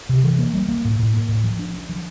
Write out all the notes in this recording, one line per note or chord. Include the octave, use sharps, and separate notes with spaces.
C3
E3
A#3
G3
A#3
A2
A2
A#3
A2
F3
D4
D4
F3